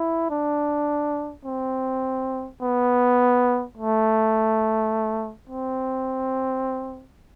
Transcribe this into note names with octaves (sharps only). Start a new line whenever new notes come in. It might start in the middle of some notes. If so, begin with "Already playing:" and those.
Already playing: E4
D4
C4
B3
A3
C4